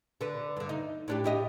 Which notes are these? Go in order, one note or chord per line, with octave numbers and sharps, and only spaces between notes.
D3 B4
G2 D3
D#4
A2 D4 G4
A2 G4 D#5